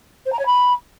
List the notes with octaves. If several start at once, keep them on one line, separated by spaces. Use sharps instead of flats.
C5
A#5
C#5
B5